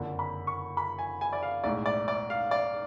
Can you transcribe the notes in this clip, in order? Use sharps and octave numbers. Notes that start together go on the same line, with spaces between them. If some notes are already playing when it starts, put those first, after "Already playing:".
Already playing: F#1 F2 D3
B5
C#6
B5
G#5
G#5
D5
F5
B1 A2 G#3 D5
D5
D5
F5
D5